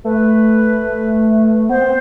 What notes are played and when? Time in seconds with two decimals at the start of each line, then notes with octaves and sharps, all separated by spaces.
0.04 A3 B4
1.69 B3 C5
1.81 C4